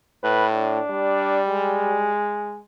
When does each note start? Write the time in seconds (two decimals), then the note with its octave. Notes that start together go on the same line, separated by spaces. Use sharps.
0.23 A2 B4
0.53 D4
0.90 G3
1.48 G#3